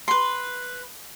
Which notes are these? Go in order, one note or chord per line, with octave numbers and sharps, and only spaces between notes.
B4 C6